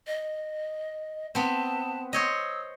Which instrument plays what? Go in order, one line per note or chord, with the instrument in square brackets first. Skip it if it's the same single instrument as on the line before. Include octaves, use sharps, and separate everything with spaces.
[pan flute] D#5
[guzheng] B3 C4 [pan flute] A5
[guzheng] C5 C#5 D#5 [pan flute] E6